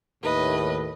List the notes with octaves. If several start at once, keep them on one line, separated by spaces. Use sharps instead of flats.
D#2 A2 B4 D#5